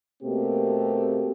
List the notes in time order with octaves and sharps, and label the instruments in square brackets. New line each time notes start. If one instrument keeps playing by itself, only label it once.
[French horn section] B2 A3 A#3 C4 G4